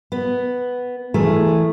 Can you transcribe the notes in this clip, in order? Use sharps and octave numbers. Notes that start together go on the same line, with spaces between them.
B3
E3 A3 G#4 A#4